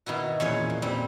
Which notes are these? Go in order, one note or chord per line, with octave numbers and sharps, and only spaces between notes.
B2 D#3 E4 F#4
E2 A#2 C#4 C#5
A#2
A#2 G3 C4